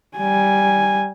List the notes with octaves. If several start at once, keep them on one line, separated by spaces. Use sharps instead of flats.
G3 G#5